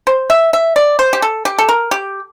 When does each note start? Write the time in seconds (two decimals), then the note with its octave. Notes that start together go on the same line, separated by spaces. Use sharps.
0.07 C5
0.30 E5
0.53 E5
0.76 D5
0.99 C5
1.13 G4
1.22 A4
1.45 G4
1.58 A4
1.69 A#4
1.91 G4